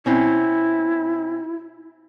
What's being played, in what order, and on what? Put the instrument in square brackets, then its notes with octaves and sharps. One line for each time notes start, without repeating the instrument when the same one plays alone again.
[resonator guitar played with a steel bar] B2 C4 C#4 [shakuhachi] E4